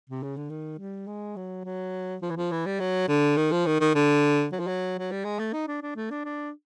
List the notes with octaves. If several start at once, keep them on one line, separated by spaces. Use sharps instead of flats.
C3
C#3
D3
D#3
G3
G#3
F#3
F#3
F3
E3
F3
E3
G3
F#3
D3
D#3
F3
D#3
D#3
D3
F#3
F3
F#3
F#3
G3
G#3
A3
D#4
D4
D4
A3
D4
D4